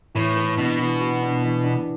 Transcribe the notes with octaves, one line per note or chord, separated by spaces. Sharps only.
A2 E3
E3
B2 D4
E3
F#4
D4
E3
D4